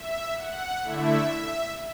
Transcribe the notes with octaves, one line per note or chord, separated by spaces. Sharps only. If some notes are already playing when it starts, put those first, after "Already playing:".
Already playing: E5
F#5
D3 A3 E4 E5